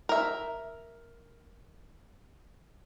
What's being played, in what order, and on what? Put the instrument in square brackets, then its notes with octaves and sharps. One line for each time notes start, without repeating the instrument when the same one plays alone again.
[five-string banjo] A#4 E5